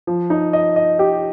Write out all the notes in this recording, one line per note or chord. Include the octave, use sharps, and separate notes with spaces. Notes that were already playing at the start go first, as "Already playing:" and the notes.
F3
D#4
D#5
D#5
G4